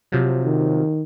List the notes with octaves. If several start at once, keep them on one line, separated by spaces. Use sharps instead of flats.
C3 F3 F#3
D#3